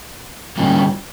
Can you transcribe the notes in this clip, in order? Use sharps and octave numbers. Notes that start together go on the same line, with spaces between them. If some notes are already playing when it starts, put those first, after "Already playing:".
D3 G3 A#3 C#4 F4